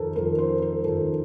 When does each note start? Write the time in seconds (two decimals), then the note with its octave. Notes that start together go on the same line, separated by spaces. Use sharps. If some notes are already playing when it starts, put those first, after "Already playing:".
Already playing: F2 D#3 A4 A#4 C5
0.16 F2 D#3 A#4
0.38 C5
0.62 A#4
0.84 F2 D#3 A4